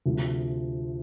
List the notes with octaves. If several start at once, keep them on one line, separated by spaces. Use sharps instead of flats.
D2 C3 F3